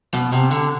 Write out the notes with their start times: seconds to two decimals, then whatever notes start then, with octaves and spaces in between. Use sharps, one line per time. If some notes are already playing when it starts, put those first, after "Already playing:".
0.14 B2
0.32 C3
0.51 D3